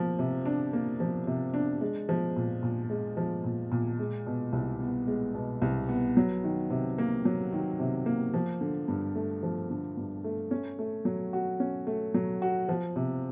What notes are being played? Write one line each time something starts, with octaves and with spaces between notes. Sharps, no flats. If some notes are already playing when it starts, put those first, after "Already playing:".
Already playing: F3 A#3
C3
D4
A#3
F3
C3
D4
G#3
F3
A#2
A#2
G#3
F3
A#2
A#2
G#3
B2
C2
B3
G#3
B2
C2
B3
F#3
D#3
C3
A#3
F#3
D#3
C3
A#3
F3
D3
G2
A3
F3
D3
G2
A3
C#4
A3
F#3
F#4
C#4
A3
F#3
F#4
F3
C3